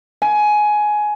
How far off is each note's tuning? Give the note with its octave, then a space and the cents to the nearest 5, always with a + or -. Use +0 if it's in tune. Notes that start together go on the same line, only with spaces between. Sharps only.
G#5 +15